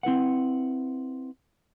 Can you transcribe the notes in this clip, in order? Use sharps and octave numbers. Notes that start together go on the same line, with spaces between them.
C4 E4 B4 F#5